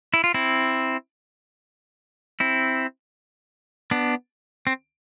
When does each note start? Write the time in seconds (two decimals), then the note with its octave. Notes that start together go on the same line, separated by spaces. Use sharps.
0.14 E4
0.24 F4
0.34 C4 E4
2.40 C4 E4
3.91 B3 D4
4.67 C4